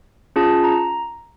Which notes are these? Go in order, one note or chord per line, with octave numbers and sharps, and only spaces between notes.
C#4 F4 G#4 A5
A#5